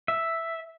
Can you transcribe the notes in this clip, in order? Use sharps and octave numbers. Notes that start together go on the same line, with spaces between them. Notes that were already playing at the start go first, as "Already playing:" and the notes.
E5